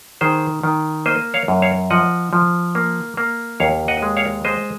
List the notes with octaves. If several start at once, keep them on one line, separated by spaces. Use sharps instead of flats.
D#3 G#4 C5
D#3
A#3 C5 D#5
C#5 F5
F#2
C#5 F5
F3 D#5 F#5
F3
A#3
A#3
D#2 C#5 F5
D#5 F#5
G#3
C#5 F5
G#3 C5 D#5